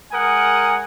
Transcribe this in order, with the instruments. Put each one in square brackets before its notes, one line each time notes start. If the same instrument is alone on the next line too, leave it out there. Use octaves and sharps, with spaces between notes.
[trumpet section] G#3 A#4 F#5 G#5 D#6